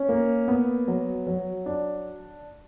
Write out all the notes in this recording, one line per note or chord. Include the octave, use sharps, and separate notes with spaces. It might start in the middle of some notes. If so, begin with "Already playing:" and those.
Already playing: C#4
A#3
B3
F#3
F#3
D4